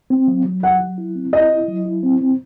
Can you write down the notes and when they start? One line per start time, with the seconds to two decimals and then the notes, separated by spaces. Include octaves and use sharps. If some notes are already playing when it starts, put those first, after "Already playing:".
0.10 C4
0.28 F#3
0.45 F#3
0.63 F#3 F#5
0.80 F#3
0.98 E4
1.15 C4
1.33 E4 D#5
1.51 E4
1.68 F#3
1.86 E4
2.03 C4
2.21 C4